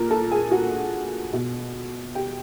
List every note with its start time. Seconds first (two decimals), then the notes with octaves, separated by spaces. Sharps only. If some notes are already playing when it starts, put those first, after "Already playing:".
Already playing: A#2 A#4 A#5
0.11 A4 A5
0.31 G#4 G#5
0.51 F#4 F#5
1.33 B2
2.15 G4 G5